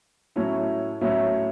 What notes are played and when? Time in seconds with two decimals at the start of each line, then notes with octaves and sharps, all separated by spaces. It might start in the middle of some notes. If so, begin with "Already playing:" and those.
0.36 A2 F#3 A3 C#4 E4
1.01 A2 F#3 A3 C#4 E4